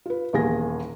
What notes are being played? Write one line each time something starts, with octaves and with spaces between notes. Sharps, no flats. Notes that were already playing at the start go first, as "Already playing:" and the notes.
F4 B4
D#1 E2 A#3 G#4 G#5 A#6